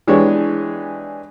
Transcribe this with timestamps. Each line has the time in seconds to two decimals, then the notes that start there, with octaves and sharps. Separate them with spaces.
0.07 E3 G#3 D4 G4 C#5